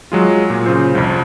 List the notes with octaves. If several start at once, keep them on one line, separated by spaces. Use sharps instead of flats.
F#3 G#3 F4
A#2
C#3 F4 C5
C2 F2